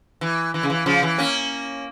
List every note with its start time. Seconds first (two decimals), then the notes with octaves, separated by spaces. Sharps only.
0.21 E3
0.54 E3
0.63 C#3
0.70 E3
0.86 C#3 F3
1.03 E3
1.18 A#3 C#4